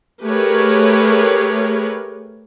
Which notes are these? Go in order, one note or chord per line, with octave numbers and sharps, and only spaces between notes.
A3 G4 G#4 A#4 B4 C#5